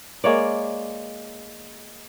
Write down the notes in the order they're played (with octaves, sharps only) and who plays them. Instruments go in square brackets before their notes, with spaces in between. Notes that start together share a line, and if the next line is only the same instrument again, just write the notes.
[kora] G#3 A#3 C#5 D5